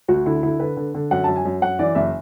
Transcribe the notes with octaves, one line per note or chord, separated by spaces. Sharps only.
D2 F#4
D3 E4
D3 E4
D3 B4
D3
D3
F#2 F#5
F#2 A5
G#5
F#2
F#2 F#5
E3 D5
F#1 E5